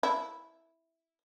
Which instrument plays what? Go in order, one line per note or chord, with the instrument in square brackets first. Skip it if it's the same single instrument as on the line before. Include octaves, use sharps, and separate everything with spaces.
[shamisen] E4